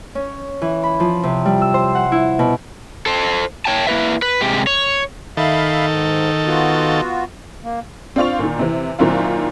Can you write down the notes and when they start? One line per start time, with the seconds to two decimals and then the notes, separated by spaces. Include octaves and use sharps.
0.15 C#4
0.62 E3
0.83 B5
1.00 F3
1.23 C3
1.45 G3
1.62 E6
1.74 C5
1.95 F#5
2.12 E4
2.39 B2
3.06 A4 C5
3.65 C#5 G5 A5
3.87 A#3 E4 B4 E5
4.22 B4
4.41 C3 G#3 G4
4.67 C#5
5.37 D#3 A4 E5 F5 B5
5.90 G#2
6.46 B3 F4 F#4
7.64 A#3
8.16 C4 D4 F4 C#6 F7
8.39 A#2 D#3
8.59 C3 E3
8.99 A#2 D#3 F#3 C4 E4 F4